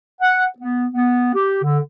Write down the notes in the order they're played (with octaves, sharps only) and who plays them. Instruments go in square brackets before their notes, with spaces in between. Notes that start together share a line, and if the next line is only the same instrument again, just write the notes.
[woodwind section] F#5
B3
B3
G4
D3